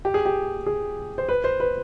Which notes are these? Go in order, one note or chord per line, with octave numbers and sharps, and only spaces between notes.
G4
G#4
G4
G#4
C5
B4
C5
B4